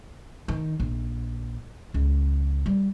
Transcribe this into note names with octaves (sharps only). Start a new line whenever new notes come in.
D#3
A#1
C#2
G3